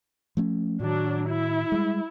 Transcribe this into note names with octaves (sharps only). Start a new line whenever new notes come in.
F3 A3 C#4
A2 D#3 F#3 D4
E4
G3 G#3